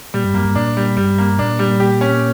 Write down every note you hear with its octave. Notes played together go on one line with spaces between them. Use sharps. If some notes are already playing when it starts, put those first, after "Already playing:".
A#2 G3
G2
F#2 A#3
G2
A#2 D4
G3
G2 G3
A#3
A#2 D4
G3
G4
C#4